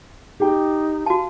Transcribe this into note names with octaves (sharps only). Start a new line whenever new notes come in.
D#4 G4 G5
F#4 F5 A5